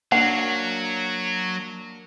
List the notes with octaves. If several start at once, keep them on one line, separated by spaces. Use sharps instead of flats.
F#3 A#3 D4 F#5